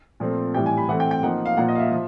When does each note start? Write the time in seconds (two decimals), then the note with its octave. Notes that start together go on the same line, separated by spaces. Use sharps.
0.20 A#2 F3 A3 C4
0.54 A2 E3 G3 G5
0.66 G#5
0.77 B5
0.89 E3 A3 C4 F#5
1.00 G5
1.11 G5
1.23 F3 A#3 D#4 F#5
1.45 F5
1.57 A#2 F3 A#3 F#5
1.68 D#5
1.75 F5
1.80 E5
1.91 F3